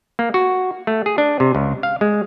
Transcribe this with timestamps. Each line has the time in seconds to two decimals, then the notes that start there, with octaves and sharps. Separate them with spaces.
0.19 A#3
0.34 F#4
0.87 A3
1.06 G#4
1.18 D4
1.40 C3
1.55 C#2
1.83 F5
2.01 G#3